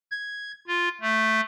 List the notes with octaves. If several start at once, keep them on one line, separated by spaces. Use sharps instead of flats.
G#6
F4
A3